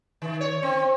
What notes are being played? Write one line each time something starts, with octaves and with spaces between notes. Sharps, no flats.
D#3
C#5
C4